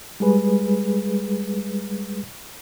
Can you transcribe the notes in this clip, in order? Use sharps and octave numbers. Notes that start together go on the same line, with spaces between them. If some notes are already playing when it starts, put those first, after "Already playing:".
G3 G#3 G#4 B4